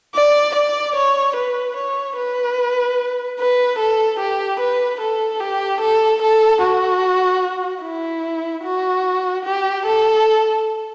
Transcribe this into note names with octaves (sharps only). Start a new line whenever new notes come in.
D5
D5
C#5
B4
C#5
B4
B4
A4
G4
B4
A4
G4
A4
A4
F#4
E4
F#4
G4
A4